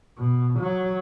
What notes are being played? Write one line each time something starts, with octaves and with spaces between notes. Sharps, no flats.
B2
F#3